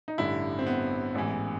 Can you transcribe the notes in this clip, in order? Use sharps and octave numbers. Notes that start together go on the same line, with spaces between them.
D#4
A1 G2 D3 E4
C4
B3
A1 G#2 E3